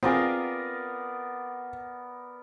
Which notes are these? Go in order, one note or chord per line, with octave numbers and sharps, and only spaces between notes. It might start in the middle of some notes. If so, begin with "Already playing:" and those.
B3 C4 F4 G#4 A#4 D5